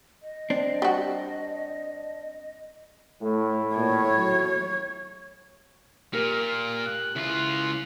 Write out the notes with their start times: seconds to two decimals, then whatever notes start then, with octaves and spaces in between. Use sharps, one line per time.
0.23 D#5
0.50 C4 D4
0.82 G3 F#4
3.22 A2 A3
3.76 A#2 C#5
4.17 F#3
6.13 A#2 G4 A#4 F6
6.86 F#6
7.16 C#2 E4 F4